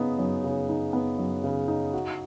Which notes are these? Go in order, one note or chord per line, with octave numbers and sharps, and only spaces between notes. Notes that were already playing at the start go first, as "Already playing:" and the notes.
Already playing: C#3 B3 D#4
F#2
C#3
D#4
B3
F#2
C#3
D#4
F#4